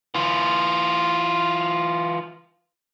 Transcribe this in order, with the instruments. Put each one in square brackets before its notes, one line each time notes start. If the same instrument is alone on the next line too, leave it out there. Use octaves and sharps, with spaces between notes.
[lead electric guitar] E3 F4